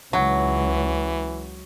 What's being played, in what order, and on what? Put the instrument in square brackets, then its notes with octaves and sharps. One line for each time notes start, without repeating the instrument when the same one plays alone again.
[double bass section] C#2 [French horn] E3 [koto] F#3